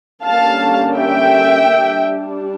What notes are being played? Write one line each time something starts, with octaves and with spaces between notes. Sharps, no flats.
D3 G3 A#3 C#4 F5 A5
E5 G5
G3 D4